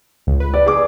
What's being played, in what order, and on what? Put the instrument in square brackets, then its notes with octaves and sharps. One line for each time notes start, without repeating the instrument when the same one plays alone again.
[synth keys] C#2
B4
[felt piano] D5
G#4 D6